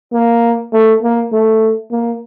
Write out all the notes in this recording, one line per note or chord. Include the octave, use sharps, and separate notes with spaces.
A#3
A3
A#3
A3
A#3